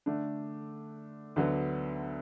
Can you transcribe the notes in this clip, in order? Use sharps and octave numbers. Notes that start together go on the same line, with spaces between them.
D3 A3 D4
D2 D3 F#3 B3